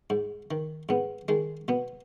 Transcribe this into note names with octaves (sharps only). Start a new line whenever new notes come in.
G#2
D#3
G#2 B3
D#3 G#3
B2 B3